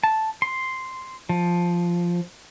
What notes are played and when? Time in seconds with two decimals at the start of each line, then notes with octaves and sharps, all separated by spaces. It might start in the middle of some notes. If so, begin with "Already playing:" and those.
0.04 A5
0.42 C6
1.29 F3